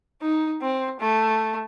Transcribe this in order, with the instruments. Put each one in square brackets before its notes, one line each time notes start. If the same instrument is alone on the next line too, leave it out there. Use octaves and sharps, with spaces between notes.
[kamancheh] D#4
C4
A3